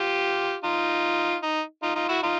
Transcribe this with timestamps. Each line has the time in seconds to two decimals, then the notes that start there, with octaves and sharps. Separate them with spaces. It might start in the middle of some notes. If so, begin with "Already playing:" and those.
Already playing: F4 G4
0.64 D#4 F4
1.43 D#4
1.83 D#4 F4
1.95 D#4 F4
2.09 E4 F#4
2.23 D#4 F4